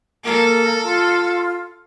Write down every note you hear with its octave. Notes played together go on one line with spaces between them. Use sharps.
A#3 A4
F4